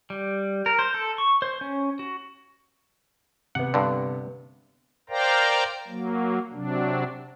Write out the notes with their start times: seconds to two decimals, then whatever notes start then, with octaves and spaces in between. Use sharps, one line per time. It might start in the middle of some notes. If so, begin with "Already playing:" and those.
0.10 G3
0.66 A#4
0.79 C5
0.94 A4
1.18 C#6
1.42 C5
1.61 C#4
1.99 F#4
3.55 C3 B3 F#5
3.74 G2 D3
5.10 A#4 C5 D5 F5 G5 A#5
5.88 F#3 A#3
6.53 C3 F#3 D4